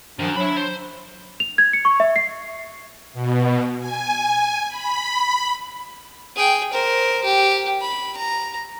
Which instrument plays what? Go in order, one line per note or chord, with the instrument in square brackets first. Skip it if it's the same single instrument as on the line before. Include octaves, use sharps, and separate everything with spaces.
[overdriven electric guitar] F#2 [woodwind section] D#3 F3 D4
[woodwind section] F#3 D4 [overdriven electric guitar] E5 B5
[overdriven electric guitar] C5
[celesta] F7
G#6
C#7
C#6
E5
C7
[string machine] B2
G#5
B5
[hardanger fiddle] G#4 G5
A#4 C5
G4
B5
A#5